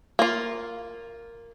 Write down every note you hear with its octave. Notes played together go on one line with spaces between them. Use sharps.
A#3 F4